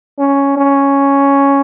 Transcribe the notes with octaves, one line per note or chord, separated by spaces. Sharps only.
C#4
C#4